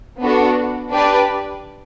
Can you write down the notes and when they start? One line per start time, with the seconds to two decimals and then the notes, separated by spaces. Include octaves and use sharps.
0.21 B3 D4 F#4 A4
0.91 D4 G4 B4 D5